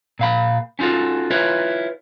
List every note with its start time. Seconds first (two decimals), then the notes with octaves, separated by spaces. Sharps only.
0.19 A#2 F5 B5
0.79 C#4 D#4 F4 F#4 A4
1.31 E4 F4 B4 C#5